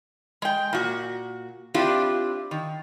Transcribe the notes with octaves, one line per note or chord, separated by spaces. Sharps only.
G#3 G5
A#2 F#4
C4 D4 E4 F4 G4 D5
D#3